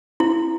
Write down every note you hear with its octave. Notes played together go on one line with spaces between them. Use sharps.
E4